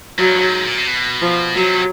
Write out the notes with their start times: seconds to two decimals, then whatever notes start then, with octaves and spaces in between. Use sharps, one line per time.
0.19 G2 F#3
0.41 G#2
0.64 A#2
0.78 C3
0.87 B2
1.22 F3
1.56 C3 F#3